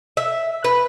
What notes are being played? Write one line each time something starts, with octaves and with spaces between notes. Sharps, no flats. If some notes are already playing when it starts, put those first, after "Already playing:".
E5
B4